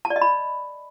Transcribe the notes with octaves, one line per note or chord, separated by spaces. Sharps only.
A5
D5
D#5
B5